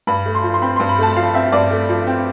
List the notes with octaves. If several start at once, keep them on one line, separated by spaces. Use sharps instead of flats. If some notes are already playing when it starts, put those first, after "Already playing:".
G2 B5
A3
C6
F3
C6
C4 B5
C6
G2
B5
A3 A5
F3 F5
C4 E5
G2 D5
A3
F3
C4